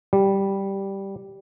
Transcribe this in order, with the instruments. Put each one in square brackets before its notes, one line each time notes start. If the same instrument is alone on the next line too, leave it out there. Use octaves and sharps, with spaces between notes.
[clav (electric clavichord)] G3